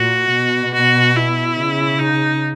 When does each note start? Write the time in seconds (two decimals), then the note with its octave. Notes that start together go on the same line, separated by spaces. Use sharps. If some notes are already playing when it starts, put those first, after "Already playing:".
Already playing: A#2 F#4
0.34 B2
0.74 F#4
1.16 E4
1.58 C#3
1.99 D#4